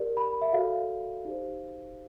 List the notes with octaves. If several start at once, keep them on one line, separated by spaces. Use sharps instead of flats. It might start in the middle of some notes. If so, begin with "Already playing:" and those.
Already playing: G4 A#4 D5
B5
E5
F#4 A4 D5 F5
D#4 G4 C5